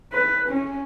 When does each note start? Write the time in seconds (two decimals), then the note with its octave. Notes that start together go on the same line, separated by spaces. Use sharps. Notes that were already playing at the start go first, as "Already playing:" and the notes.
0.13 B4
0.50 C#4